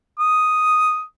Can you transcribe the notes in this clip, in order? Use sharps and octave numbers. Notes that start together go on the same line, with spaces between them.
D#6